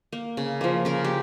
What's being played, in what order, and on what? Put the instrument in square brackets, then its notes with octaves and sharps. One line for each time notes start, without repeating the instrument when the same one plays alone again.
[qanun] A#3
C#3
F3 A#3
C#3 A#4
G4